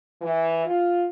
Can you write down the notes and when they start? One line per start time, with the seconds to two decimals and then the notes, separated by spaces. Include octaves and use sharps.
0.21 E3
0.65 F4